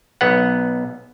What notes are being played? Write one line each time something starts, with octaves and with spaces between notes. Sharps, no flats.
B1 B3 F#5